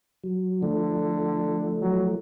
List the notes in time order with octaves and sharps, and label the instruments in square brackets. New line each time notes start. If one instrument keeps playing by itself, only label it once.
[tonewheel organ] F#3
[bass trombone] D3 [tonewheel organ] F3 A3
[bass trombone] F#3